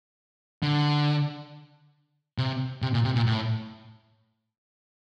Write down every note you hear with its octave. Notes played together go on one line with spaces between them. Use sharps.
D3
C3
C3
A#2
C3
A#2
A2